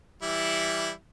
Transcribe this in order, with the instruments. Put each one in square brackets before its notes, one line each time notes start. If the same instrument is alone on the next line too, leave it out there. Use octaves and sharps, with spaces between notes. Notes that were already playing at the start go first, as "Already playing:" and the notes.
[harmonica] E3 G3 E4